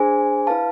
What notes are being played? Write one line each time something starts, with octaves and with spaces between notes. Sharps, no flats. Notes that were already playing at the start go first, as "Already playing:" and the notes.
Already playing: D4 G#4 C5 G#5
E4 B4 F5 A5